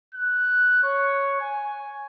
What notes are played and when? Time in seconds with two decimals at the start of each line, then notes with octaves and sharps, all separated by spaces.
0.15 F#6
0.83 C#5
1.41 G#5